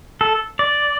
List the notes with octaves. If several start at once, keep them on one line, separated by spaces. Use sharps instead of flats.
A4
D5